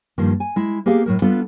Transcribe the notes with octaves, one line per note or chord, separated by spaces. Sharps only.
G2 D#3 F3 A#3
G#5
G#3 E4
A#3 B3 G4 G#4 F5
A2 F#3 A#4
G3 B3 D4 F4 A4 B4